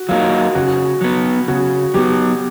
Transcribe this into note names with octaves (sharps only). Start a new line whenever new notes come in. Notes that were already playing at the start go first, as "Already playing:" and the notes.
Already playing: F#4
F#3 A#3 D#4 F4
C#3 F#4
F#3 B3
C#3 F#4
F#3 B3 G4